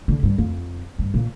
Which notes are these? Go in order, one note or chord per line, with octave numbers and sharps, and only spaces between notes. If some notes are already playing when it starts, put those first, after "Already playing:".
D3
G2
F2
G2
A#2